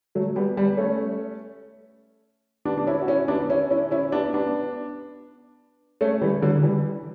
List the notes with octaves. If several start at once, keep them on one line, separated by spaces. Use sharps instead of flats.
F#3 A3
G3 B3
G3 B3
A3 C#4
B3 D4
D4
C#4 E4
F#4
C#4 E4
B3 D4
C#4 E4
C#4 E4
C#4 E4
B3 D4
B3 D4
A3 C#4
E3 G3
D3 F#3
E3 G3